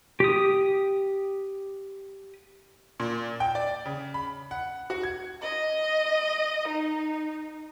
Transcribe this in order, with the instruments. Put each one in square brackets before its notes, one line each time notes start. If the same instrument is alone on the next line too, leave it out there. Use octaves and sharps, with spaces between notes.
[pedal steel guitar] G4 D#6
[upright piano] A#2
G5
D5
C#3
B5
F#5
F#4
G#6
[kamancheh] D#5
D#4